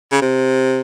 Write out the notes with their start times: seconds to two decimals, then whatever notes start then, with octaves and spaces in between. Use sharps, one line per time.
0.12 C#3
0.22 C3